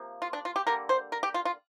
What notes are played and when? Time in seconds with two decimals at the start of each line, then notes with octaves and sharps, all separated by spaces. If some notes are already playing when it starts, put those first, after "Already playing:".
Already playing: C3 F3 A#3
0.22 F4
0.33 D4
0.45 F4
0.56 G4
0.67 D3 G3 A#3 A#4
0.89 C5
1.12 A#4
1.23 G4
1.34 F4
1.45 F4